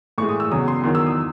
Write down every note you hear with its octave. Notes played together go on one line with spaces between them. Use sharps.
A2 E3 G#3 C#6
D#6
E6
E2 C#3 F#3 D#6
C6
E2 D#3 F#3 C6
E6
D#6